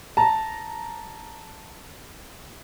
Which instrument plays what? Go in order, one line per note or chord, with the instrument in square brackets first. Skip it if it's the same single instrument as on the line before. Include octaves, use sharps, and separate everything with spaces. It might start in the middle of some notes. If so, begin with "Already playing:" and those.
[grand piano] A5 A#5